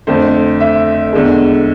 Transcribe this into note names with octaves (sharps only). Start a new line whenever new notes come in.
F2 D3 A3 C5
E5
E2 D3 G#3